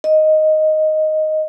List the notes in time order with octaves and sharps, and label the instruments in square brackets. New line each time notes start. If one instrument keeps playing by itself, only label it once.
[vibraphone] D#5